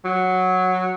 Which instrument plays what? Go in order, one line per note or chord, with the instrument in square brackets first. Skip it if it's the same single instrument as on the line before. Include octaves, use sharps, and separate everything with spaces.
[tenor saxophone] F#3